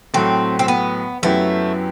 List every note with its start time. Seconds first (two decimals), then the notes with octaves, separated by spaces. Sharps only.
0.14 A2 F#3 A3 C4
0.59 C4
0.68 B3
1.23 F#2 F#3 A3 B3 E4 G4